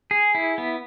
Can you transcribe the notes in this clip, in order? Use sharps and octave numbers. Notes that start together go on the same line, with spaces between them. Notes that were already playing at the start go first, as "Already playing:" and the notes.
G#4
E4
B3